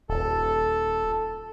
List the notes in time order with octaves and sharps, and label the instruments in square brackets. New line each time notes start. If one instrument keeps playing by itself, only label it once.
[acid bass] D#1 [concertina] A4